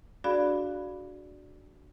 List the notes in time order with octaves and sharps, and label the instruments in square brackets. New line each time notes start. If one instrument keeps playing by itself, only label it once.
[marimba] D4 F#4 G#4 D5 F5 B5